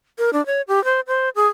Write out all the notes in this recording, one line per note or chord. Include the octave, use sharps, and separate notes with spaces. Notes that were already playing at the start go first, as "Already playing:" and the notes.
A#4
D4
C#5
G4
C5
C5
G#4